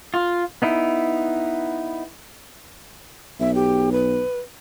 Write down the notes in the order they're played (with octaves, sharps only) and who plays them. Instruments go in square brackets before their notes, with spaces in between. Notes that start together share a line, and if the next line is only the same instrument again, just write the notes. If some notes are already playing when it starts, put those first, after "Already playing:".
[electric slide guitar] F4
[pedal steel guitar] B3 D#4 E4
[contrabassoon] B1 [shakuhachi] E5
[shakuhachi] G4
B4